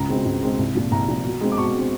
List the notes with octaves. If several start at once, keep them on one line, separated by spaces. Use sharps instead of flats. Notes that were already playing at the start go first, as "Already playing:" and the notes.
Already playing: C#2 A#5
B2 G#3 C4
C#2
B2 G#3 C4
C2
A#2 F3
C2 A#5
A#2 F3
B2
G#3 C4
D6
B2 C#6
G#3 C4